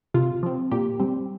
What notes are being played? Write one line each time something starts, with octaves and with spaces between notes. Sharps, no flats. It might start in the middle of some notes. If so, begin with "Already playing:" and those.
C3 F4
F3 C4
A#2 G4
G3 C4